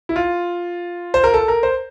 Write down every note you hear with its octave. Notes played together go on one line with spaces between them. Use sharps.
E4
F4
C5
A#4
A4
A#4
C5